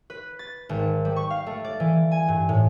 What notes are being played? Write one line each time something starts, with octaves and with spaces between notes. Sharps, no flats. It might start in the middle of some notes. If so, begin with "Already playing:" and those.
B4
A6
G#1
G3
C#6
F5
A3
D5
E3
G#5
G2
A2